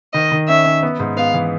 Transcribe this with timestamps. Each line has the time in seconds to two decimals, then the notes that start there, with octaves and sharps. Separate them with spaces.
0.13 D#3 D#5
0.32 D#3
0.48 C#4 E5
0.66 C#4
0.83 B3
1.00 G#2
1.17 B3 F5
1.34 E3